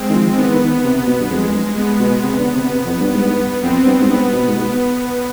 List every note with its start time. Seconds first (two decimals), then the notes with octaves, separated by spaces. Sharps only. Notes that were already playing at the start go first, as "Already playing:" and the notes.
Already playing: G#3 C4
0.10 D#3
0.14 F3
0.38 D#3 B3
0.53 D#3
0.84 C3
1.07 B2
1.20 G2
1.30 F2 G#3
1.49 F2
1.54 G2
1.77 B3
2.00 B2
2.24 C3
2.39 D3
2.55 C3
2.70 C3
2.85 F2
3.01 G2
3.13 G#2 B3
3.25 G2
3.62 F2 C4
3.86 G2
4.01 G#2
4.09 G2 B3
4.33 B2
4.47 G#2
4.56 B2